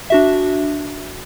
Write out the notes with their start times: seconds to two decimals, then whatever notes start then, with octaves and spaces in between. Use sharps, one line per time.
0.10 D4 F#4 E5